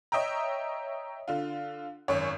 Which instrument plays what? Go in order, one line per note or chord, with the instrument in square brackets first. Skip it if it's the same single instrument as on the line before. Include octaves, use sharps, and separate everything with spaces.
[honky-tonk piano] C#5 D#5 E5 G5 A#5
D3 F4
G#1 F#2 C#5